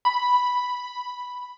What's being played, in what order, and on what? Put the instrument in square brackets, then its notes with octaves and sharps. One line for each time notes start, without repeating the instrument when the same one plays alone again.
[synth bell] B5